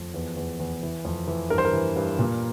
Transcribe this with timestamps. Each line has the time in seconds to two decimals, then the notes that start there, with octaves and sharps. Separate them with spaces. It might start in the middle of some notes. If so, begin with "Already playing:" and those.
Already playing: F2
0.14 E2
0.37 E2
0.60 E2
0.83 E3
1.05 F2
1.27 E3
1.50 G2 A#4
1.58 C5
1.65 A#4
1.73 E3
1.96 G2
2.19 A#2